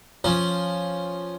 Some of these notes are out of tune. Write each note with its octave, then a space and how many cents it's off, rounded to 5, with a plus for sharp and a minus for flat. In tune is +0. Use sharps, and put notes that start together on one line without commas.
F3 +0 C#4 +0